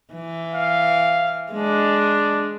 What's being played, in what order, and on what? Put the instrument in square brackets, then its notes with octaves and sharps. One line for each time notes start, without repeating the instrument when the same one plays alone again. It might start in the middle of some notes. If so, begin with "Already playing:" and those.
[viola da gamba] E3
[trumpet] F5
[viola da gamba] G#3 [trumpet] D4